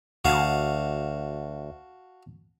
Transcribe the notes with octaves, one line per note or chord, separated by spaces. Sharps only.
D2 F#4 F5 A5